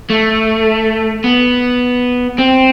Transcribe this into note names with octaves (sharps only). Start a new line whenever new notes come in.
A3
B3
C4